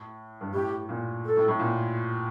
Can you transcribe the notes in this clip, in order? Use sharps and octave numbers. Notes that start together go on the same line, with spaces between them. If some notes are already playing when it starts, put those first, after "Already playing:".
Already playing: A2
G2
A2 G4
A#2
A4
A2
A2
A#2